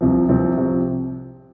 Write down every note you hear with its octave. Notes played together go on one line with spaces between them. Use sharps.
C2 C3 F3 C4
C2 C3 F3 C4
C3 F3 C4